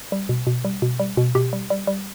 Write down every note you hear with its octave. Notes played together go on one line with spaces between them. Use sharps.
G3
B2
B2
G3
B2
G3
B2
B2 G4
G3
G3
G3